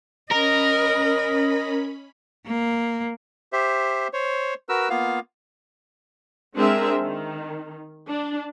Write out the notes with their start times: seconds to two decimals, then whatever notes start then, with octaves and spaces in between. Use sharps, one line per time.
0.32 C#4 A#4 D#5 B5
2.46 A#3
3.53 G4 C5 E5
4.13 C5 C#5
4.69 F#4 A#4 B4 E6
4.90 A#3 B3 F4 F5
6.56 G#3 C4 D4 G#4 A#4 E5
7.01 D#3
8.09 D4